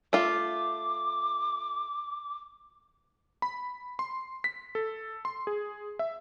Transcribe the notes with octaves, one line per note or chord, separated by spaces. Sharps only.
A3 F4 D6
B5
C6
B6
A4
C6
G#4
E5